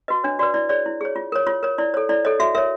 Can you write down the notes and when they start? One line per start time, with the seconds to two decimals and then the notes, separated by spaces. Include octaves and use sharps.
0.08 F#4 B4 D#5
0.24 D4 C#5
0.39 F#4 B4 D5
0.54 E4 D5
0.69 G#4 C#5 D5
0.86 E4
1.01 G#4 C#5
1.16 F4
1.32 A#4 C#5
1.47 F4 C#5
1.63 A#4 C#5
1.78 E4 D5
1.94 A4 C#5
2.09 E4 D5
2.25 A4 C#5 D#5
2.39 F#4 E5
2.55 A#4 C#5 E5